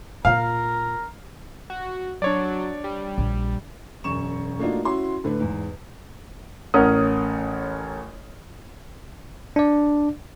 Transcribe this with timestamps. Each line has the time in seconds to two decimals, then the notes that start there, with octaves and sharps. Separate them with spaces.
0.25 A#2 F4 A#4 F5
1.70 F#4
2.22 F#3 D4 C#5 D5
2.84 G3
3.18 A#1
4.04 E1 F#2 C#6 E7
4.59 A3 A#3 D4 D#4 F4 F#4
4.85 C#4 E4 F#4 C6
5.24 A2 D3 A3 B4
5.40 E2 G#2
6.74 A1 C#4 A#4 F#5 D#6
9.56 D4 D5